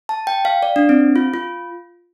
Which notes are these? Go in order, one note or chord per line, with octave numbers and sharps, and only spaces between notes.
A5
G5
F5
D5
D4
C4
F4
F4